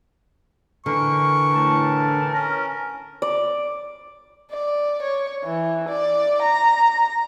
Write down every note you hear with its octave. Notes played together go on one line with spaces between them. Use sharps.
D3 E3 A#4 C#6
A2 A5
C#4 A#4 A#5
D5
D5
C#5
E3
D5
A#5